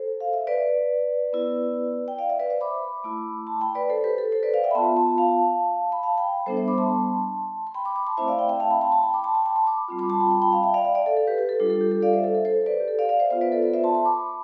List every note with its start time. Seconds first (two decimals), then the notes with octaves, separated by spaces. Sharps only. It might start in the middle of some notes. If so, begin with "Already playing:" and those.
Already playing: A4 C5
0.20 F5
0.33 E5
0.47 B4 D5
1.33 B3 E4
2.08 G5
2.18 D5 F5
2.30 E5
2.39 B4 D5
2.50 C5 E5
2.61 B5 D6
3.04 A3 E4
3.47 A5 C6
3.61 G5 B5
3.75 B4 D5
3.90 A4 C5
4.04 G4 B4
4.18 A4
4.32 A4 C5
4.43 B4 D5
4.54 D5 F5
4.64 E5 G5
4.71 B5
4.75 B3 F4 A5 C6
4.96 A5 C6
5.18 F5 A5
5.92 B5
6.03 F5 A5
6.18 G5 B5
6.46 G3 B3 D4 A4 C5
6.57 C5 E5
6.68 B5 D6
6.78 A5 C6
7.67 C6
7.74 G5 B5
7.85 B5 D6
7.96 B5 D6
8.07 A5 C6
8.17 A3 C4 E4 C5 E5
8.28 D5 F5
8.39 E5 G5
8.49 E5 G5
8.60 F5 A5
8.71 G5 B5
8.81 A5 C6
8.92 A5 C6
9.03 G5 B5
9.13 B5 D6
9.24 A5 C6
9.35 G5 B5
9.46 A5 C6
9.56 A5 C6
9.67 B5 D6
9.88 G3 C4 F4
9.99 B5 D6
10.09 A5 C6
10.20 G5 B5
10.31 A5 C6
10.42 G5 B5
10.52 F5 A5
10.63 E5 G5
10.74 D5 F5
10.85 E5 G5
10.95 D5 F5
11.06 A4
11.17 A4
11.27 G4 B4
11.38 G4 B4
11.49 A4
11.60 G3 D4 F4 A4
11.70 A4
11.81 G4
11.91 A4
12.02 D5 F5
12.13 C5 E5
12.24 A4
12.34 A4
12.45 A4 C5
12.66 B4 D5
12.80 G4
12.88 A4
12.99 D5 F5
13.09 D5 F5
13.20 C5 E5
13.30 B3 F4 C5 E5
13.41 B4 D5
13.52 A4 C5
13.63 B4 D5
13.73 C5 E5
13.84 A5 C6
13.95 A5 C6
14.05 B5 D6